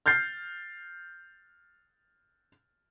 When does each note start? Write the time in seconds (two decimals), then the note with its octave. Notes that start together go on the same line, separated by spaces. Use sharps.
0.06 F6 G6 A6 C7